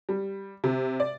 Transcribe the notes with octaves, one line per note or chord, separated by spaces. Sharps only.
G3
C3
D5